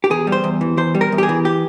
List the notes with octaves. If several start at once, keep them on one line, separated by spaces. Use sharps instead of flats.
G4
E2 G#4
G3
C5
E2
E3
E2 C5
G3
A#4
E2
G4
G#4
E3
G4